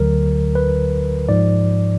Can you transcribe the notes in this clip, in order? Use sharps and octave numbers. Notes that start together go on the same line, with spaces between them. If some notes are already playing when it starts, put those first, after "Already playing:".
Already playing: D2 D3 F#3 A#4
B4
G#2 F3 D5